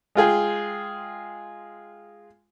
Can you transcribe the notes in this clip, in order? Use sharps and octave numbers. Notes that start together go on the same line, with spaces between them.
G#3 F4 G#4 G5